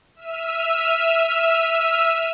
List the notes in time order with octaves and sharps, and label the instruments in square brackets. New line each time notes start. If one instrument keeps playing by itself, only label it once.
[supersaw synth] E5 E6 F6 D#7